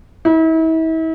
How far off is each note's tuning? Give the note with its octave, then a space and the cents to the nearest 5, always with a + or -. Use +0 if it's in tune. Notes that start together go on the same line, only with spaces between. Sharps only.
E4 -40